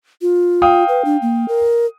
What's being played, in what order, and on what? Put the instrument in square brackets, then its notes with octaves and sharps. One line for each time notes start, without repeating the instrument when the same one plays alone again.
[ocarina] F4
[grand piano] F5 G5 D#6
[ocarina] B4
D4
A#3
A#4